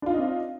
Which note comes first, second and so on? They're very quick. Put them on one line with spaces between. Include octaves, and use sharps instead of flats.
D4 F4 D#4 D#5 C4